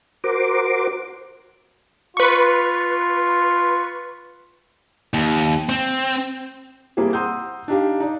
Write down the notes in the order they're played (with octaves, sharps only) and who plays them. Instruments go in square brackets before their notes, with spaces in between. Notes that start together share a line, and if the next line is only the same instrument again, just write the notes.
[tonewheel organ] F#4 A#4 C5 D6
[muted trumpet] F4 [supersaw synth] B4 C#6
[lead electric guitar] D#2
C4
[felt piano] G3 A#3 C4 E4 G4 G#4
F#5 A#5 C6 D#6 E6 G6
D4 D#4 G4 F5
D#4 D5